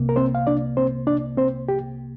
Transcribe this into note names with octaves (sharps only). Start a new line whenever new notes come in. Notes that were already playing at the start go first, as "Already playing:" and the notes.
Already playing: C2 C3 A#3
A#4
C4 C5
F5
D4 D5
C4 C5
D4 D5
C4 C5
G4